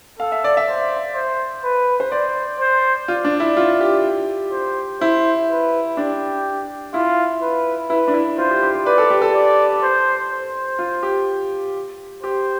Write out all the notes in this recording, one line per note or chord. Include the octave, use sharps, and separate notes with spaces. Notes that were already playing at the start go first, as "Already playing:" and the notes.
A4 F5
E5
D5
E5
C5
C5
B4
C5
C5 D5
C5
F4 D5
D4
E4
F4
G4
C5
E4 C5
B4
D4 G4
E4 F4
B4
E4 B4
D4
E4
F4 C5
G4
G4
G4
B4 D5
A4
G4
A4
D5
C5
C5
F4
G4
G4 C5